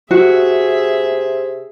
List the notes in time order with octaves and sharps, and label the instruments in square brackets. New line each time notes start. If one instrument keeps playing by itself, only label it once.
[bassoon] C3 [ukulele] F#4 [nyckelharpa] G#4 E5